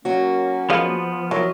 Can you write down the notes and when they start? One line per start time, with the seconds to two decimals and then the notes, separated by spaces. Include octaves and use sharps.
0.05 F#3 A#3 C#4 F#4
0.70 F3 B3 G#4 D#5 F5
1.31 E3 F#3 A#4 D#5